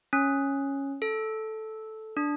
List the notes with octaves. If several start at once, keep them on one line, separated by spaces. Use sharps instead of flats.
C#4
A4
D4